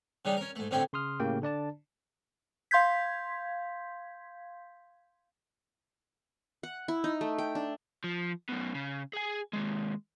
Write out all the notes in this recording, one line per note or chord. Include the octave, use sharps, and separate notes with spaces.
C#3 G3 D4 D#4
C#4 A#4
G#2 A3
A2 D3 C4 C#4 G5
C#3 C6 D#6 F6
A2 C#3 A#3 G4 G5
D3 D4 D5 A5
F5 C6 G6 G#6 B6
F#5
E4
D#4
A3
G5
D4
F3
F#2 B2
C#3
G#4 G#5
D#2 G#3